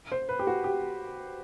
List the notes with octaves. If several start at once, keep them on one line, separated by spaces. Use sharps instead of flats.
C5
B4
G4
F#4
G4